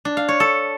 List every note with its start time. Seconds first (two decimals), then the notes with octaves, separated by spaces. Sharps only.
0.05 D4
0.17 F5
0.28 C#5
0.40 A4